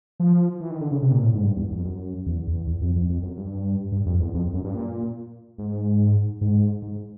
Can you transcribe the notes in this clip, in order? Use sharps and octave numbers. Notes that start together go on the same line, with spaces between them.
F3
E3
D#3
D3
C#3
C3
A#2
A2
G#2
G2
E2
F2
F#2
E2
E2
E2
F2
F2
F2
F#2
G2
G2
F2
E2
F2
F#2
G2
A#2
G#2
G#2
G#2